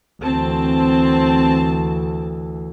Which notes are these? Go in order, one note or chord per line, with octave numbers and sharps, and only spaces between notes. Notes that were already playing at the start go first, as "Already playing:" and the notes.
D2 E3 C4 A5